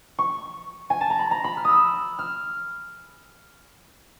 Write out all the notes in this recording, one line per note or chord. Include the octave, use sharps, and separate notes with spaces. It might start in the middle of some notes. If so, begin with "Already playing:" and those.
C#6
G#5
A5
A#5
B5
A#5
B5
F6
D#6 E6
F6